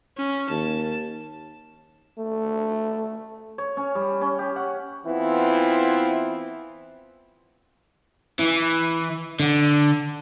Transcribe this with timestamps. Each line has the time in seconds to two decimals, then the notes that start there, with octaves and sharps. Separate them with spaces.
0.18 C#4
0.50 D#2 A5
2.18 A3
3.58 C#5
3.77 C#4
3.95 G3
4.21 C#4
4.39 G4
4.56 F#5
5.06 E3 B3 C4 E4 F4
8.39 E3
9.40 D3